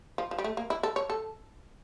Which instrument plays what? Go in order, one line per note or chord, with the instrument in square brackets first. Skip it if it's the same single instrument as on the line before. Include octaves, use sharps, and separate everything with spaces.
[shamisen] F3
F3
G3
A3
A#3
E4
A4
C#5
A4